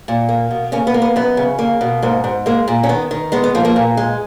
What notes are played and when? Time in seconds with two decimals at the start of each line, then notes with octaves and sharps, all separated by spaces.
0.08 A#2
0.29 A#3
0.51 B2
0.72 C#3 A#3 C#4
0.87 B3
0.94 A#3
1.02 B3
1.16 F#2 B3
1.37 C#3
1.59 A#3
1.81 B2
2.03 G#2 A#3
2.24 G#2
2.46 G#3 A#3
2.68 A#2
2.83 C#4
2.89 D#3 B3
3.11 D#3
3.32 G#3 B3
3.44 B3
3.55 F3 A#3
3.65 A#3
3.76 A#2
3.97 G#3